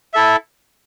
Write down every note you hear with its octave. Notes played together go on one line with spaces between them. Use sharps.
E4 A4 E5